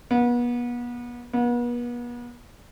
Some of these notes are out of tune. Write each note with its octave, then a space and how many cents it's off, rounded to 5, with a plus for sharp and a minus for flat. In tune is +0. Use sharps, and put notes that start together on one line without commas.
B3 -35
B3 -40